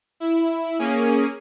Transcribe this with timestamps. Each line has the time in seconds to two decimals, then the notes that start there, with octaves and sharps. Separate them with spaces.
0.20 E4
0.79 A#3 C#4 G#4 D#7